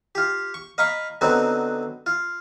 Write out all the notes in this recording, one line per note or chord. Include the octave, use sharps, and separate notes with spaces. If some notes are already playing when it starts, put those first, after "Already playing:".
F4 G4
C#6
D#5 F5 A#5 B5 C#6
D3 F#3 B3 C4 D#4 F#4
F4